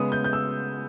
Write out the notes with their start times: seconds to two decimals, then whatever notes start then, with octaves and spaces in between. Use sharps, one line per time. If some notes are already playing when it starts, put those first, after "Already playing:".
Already playing: C#3 G#3 B3 D#6
0.12 G6
0.24 G6
0.33 E6